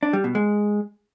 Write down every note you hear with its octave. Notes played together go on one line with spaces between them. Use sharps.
D4
G3
B2
G#3